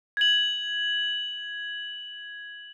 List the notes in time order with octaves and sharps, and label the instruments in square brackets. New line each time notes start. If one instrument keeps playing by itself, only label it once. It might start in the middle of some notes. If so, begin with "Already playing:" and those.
[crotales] G#6 F#7